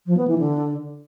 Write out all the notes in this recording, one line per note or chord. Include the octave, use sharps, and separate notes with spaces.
F3
B3
E3
D3